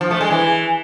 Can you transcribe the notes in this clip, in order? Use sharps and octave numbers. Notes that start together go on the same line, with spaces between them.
F3
A3
G#3
E3